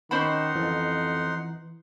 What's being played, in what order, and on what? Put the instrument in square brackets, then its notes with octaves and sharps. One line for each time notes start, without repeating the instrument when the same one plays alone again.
[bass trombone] D#3 [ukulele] C#4 C5 B5 [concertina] D#4 F#5 C6
[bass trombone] F2 [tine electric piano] E3